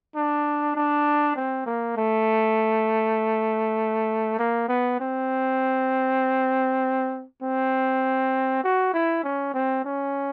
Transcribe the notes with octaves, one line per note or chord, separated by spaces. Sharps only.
D4
D4
C4
A#3
A3
A#3
B3
C4
C4
F#4
E4
C#4
C4
C#4